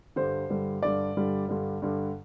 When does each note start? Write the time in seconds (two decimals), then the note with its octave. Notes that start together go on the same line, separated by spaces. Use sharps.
0.16 G2 D3 G3 C5
0.50 G2 D3 G3
0.82 G2 D3 G3 D5
1.17 G2 D3 G3
1.49 G2 D3 G3
1.82 G2 D3 G3